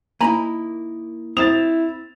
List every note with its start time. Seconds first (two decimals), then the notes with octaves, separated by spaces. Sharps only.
0.21 A#3 D#4 E4 G#5 A#5 B5
1.37 C4 E4 D#6 A6 E7 F7